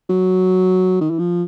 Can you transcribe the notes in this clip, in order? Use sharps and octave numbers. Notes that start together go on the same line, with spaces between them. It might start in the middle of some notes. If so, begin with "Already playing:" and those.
F#3
D#3
E3
F3